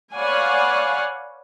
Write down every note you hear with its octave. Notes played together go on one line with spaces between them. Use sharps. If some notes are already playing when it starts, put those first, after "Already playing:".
B4 C#5 D5 F5 F#5 G#5